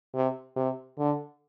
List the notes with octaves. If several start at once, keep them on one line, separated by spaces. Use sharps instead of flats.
C3
C3
D3